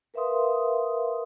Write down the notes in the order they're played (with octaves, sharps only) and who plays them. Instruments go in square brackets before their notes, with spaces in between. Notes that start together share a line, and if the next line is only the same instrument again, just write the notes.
[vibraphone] A#4 B4 E5 F5 C6 D#6